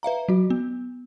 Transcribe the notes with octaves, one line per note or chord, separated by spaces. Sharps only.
B4 E5 F5 A#5
F#3 F#4
B3